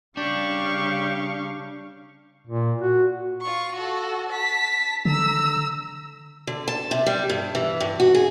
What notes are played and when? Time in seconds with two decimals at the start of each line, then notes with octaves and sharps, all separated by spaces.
0.17 C#3 G3 D4 G4 F5 C#6
2.47 A#2
2.81 F#4
3.42 F4 C#6
3.76 F#4 A4
4.29 A5 B6
5.05 D3 A#5 E6
6.47 D3
6.68 A5
6.91 C3
7.06 G3
7.30 G2
7.55 E3
7.80 G2
8.00 F#4
8.14 G#4